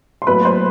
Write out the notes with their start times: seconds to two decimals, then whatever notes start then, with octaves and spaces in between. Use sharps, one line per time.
0.22 C6
0.27 A2 F#3 A#3 B4 B5
0.45 C5 C6